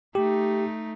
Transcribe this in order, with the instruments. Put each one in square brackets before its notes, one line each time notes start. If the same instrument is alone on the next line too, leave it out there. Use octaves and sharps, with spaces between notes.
[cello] A3 D#4 [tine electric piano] G4